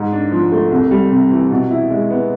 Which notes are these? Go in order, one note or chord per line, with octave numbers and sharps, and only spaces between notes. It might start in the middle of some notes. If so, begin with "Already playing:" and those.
Already playing: G#2
D4
F3
A3
C2
G3
C3
E3
B2
E4
G#3
B3